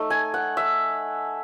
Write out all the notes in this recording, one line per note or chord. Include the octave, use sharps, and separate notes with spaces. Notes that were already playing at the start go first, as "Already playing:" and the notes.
Already playing: A3 D#4
G#5
F#5
E5